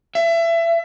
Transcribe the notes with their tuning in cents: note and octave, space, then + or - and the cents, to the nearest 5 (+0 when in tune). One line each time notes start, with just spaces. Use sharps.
E5 +25